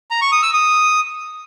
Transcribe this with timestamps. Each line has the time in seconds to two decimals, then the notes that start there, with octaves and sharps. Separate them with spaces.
0.11 A#5
0.21 C#6
0.32 D#6
0.43 E6
0.53 D#6